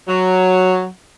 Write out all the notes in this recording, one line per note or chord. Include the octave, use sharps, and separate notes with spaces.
F#3